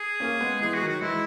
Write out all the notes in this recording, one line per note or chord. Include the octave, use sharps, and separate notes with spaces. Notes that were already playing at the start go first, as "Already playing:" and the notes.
Already playing: G#4
A#3 C#4
G#3 B3
E3 G#3 G#4
F#4
D#3 F#3
F#4
E3 G#3 E4